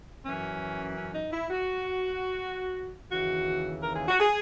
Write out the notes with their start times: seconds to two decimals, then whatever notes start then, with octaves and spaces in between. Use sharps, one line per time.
0.24 F#2 E3 C#4
0.95 C#4
1.14 D#4
1.32 E4
1.50 F#4
3.11 D#2 C#3 E3 F#4
3.82 A#4
3.95 G#4
4.08 F#4
4.20 G#4